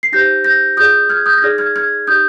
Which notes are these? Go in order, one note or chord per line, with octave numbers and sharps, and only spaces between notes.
C7
D#4 G4 C5 G6 A#6
G6 A#6
F4 G#4 D5 D#6 G6
F6 G#6
D#6 G6
A#6
D#4 G#4 D5 F6 G#6
F6 G#6
F6 G#6
D#4 G4 D5 D#6 G6